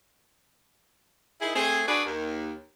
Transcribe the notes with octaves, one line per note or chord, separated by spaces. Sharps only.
D#3 E4 G#4
A3 C4 G#4
D4 F#4 G#4 B4
D#2